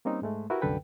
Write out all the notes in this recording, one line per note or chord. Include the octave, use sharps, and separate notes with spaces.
G3 A#3 C4 C#4 D#4
G#2 G#3 A3
E4 F#4 G4 A#4 B4
C2 F#2 D3 A4 B4 G5